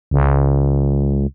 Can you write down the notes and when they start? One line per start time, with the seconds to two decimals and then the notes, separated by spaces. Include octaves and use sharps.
0.11 C#2